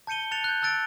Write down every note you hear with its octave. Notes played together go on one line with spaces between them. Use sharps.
A5 G6 C#7 D#7 G7
A5 F#6 A6 C#7 F7
F#6 G6
A5 E6 F#6 A6 D7